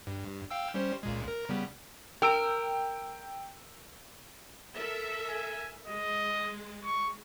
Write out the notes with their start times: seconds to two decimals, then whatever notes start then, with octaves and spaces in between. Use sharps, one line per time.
0.07 G2
0.51 F5 G5 E6
0.74 G3 C#4 C5
1.03 C#2 A#2 G#3
1.28 A#4
1.49 C#3 G3 B3
2.22 A#4 G5 E6 D7
4.75 A4 A#4 E5
5.29 G#5
5.87 G#3 D#5
6.85 C#6